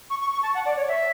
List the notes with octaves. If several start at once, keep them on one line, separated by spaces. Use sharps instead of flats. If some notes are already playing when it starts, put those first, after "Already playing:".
C#6
C#6
C#6
A5
F#5
D5
C#5
E5